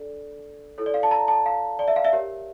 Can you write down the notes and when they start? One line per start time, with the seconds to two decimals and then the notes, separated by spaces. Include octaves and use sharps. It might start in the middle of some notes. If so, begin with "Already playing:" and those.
Already playing: D4 A4 D5
0.78 E4 A4 C#5
0.86 D5
0.94 F5
1.03 A5
1.11 A#5
1.28 A5
1.46 F5
1.79 D5
1.88 E5
1.96 F5
2.05 E5
2.13 G4 A#4 C#5